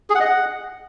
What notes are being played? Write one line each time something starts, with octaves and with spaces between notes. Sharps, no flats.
G#4
F#5
D#5
F#5